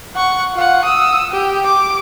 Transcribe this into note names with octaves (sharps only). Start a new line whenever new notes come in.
F#5 C#6
F4 F#5
D#6 E6
G4
D6